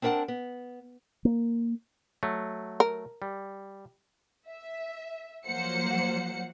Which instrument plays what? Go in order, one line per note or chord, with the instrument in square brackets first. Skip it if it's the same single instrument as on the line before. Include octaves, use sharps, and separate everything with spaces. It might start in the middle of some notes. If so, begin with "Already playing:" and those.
[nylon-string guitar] C4 D4 A#4 E5 F#5 A5
B3
[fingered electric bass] A#3
[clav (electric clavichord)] F#3 A3
[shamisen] A#4
[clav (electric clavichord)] G3
[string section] E5
F3 F#3 A#3 C5 F#5 C#7